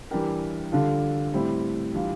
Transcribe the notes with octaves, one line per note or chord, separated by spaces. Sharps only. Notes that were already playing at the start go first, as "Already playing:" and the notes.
E3 G3 D4 G4 A#4
D3 G3 D4 F4 A4
A2 G3 C4 E4
E3 G3 D4 F4